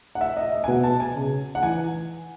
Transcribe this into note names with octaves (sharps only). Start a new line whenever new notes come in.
F#5
E5
D#5
E5
G#5
B2 F#5
A5
G#5
C#3
F#5
E3 G#5